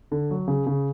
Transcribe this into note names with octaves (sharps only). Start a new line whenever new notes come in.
D3
F#3
C#3
C#3